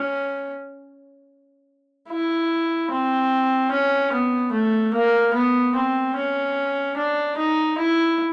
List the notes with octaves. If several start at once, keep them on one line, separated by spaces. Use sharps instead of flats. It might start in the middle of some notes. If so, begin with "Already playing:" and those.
Already playing: C#4
E4
C4
C#4
B3
A3
A#3
B3
C4
C#4
D4
D#4
E4